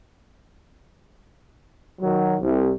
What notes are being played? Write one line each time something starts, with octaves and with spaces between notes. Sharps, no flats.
D#3 F#3
C2